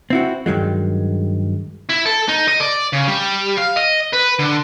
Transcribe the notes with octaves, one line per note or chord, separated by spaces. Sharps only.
C4 E4 F#4
G2 D#3 F#3 G#3
E4
A4
D#4
D#5
D5
C#3
G3
F5
D#5
B4
D3